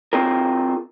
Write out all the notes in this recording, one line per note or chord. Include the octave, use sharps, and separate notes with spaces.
C4 F4 G#4 A#4